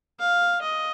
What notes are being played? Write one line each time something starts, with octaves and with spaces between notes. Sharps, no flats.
F5
D#5